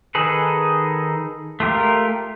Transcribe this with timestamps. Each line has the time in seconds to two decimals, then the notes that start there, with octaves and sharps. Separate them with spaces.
0.15 D#3 D#4 G#4 A4 B4
1.60 A3 F4 G4 A#4